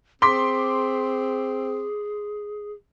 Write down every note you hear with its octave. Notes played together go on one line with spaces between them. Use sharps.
C4 G#4 C6 D6 B6